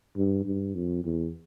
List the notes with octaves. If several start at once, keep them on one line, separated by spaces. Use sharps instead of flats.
G2
G2
F2
E2